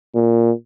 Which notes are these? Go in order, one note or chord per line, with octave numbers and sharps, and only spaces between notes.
A#2